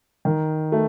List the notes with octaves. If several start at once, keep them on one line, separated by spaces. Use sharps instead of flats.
D#3
A3